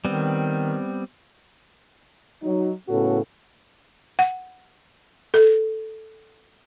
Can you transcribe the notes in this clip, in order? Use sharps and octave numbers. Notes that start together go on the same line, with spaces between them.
D#3 G3 B3 C4
F#3 D#4
A2 C#3 B3 C#4 F#4 A4
F#5
A4